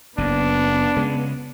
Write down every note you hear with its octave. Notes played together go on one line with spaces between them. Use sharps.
F#1 F#2 B3 D4
C#3 G#3